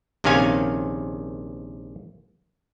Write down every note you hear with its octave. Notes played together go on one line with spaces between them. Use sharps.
A#1 C3 D#3 C#4 F5 G#5